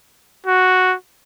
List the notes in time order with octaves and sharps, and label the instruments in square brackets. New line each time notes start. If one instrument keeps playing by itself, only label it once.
[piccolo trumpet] F#4